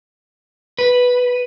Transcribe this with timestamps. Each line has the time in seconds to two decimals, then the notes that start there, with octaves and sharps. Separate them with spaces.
0.79 B4